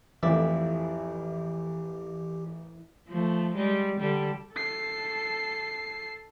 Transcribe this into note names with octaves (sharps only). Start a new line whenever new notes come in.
A1 F2 A2 E3 G4 D5 E5
F3 A3
G3 G#3
D3 G3 A4
A4 C7